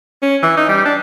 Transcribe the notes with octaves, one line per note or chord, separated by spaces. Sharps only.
C#4
E3
D#4
G3
D4